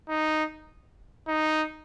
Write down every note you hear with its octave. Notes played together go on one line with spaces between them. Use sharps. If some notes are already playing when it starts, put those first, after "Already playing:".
D#4
D#4